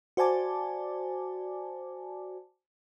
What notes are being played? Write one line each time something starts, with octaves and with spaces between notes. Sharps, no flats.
F#4 C5 D5 G#5 A5 D6